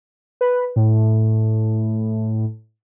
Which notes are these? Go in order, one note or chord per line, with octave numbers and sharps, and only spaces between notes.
B4
A2